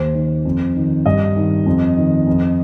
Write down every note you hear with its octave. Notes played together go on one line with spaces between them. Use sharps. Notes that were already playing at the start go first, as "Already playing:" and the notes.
Already playing: D#2 C5
D#3
F2
D#3
G2 D#5
D#3
F2
D#3
F2